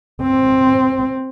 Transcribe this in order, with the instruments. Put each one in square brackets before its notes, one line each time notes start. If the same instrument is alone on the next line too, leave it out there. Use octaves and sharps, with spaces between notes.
[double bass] C4